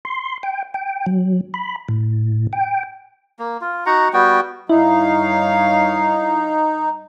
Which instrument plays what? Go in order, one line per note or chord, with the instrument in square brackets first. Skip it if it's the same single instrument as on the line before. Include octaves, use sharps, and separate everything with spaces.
[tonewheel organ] C6
G5
G5
F#3
B5
A2
G5
[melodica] A#3
F4
D#4 F#4 F#5 A#5
G3 B3 F#4 G5
[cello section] G2 C#5 F5 [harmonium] D#4 [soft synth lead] E4